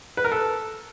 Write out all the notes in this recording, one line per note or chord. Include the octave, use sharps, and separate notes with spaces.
B4
A#4
A4